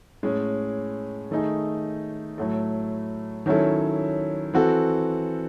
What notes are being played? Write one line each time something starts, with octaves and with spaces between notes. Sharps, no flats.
A2 G#3 C#4
D#3 A3 D#4 G#4
A2 F#3 A3
D#3 F#3 C#4 E4 A4
E3 C4 F#4 A4